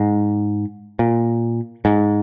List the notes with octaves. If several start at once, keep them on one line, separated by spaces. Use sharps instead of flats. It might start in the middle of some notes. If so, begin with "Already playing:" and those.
Already playing: G#2
A#2
G#2